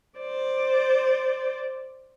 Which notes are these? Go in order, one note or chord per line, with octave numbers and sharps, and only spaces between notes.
C5 D5